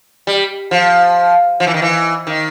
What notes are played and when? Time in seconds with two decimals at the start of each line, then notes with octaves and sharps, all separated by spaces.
0.27 G3
0.71 F3
1.60 F3
1.67 E3
1.74 D#3
1.82 E3
2.27 D#3